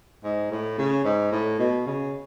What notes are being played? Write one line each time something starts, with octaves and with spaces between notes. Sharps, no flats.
G#2
A2
C#3
G#2
A2
B2
C#3